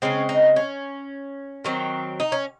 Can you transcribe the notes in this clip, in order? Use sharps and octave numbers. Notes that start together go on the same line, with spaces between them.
C#3 G#3 C4 C#4
D#4
C#4
D#3 F#3 C4
D#4
C#4